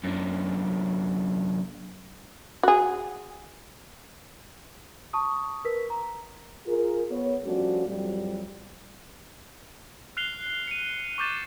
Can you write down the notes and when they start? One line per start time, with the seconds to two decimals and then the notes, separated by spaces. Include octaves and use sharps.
0.04 F#2 D3
2.63 F#4 G#4
5.13 A5 C#6 D#6
5.65 A#4 B4 B6
5.90 A#5
6.66 F4 G#4 A#4
7.11 B3 C#5
7.44 F3 G3 A3 C#4 D4 F#4
7.86 F2 A2 F#3 G3
10.17 F6 F#6 C7 F7 G7
10.68 C#7 D#7
11.18 C#6 D6 G6 A6 E7